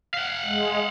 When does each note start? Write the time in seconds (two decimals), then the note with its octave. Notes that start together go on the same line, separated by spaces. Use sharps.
0.14 F5 F#5
0.45 G#3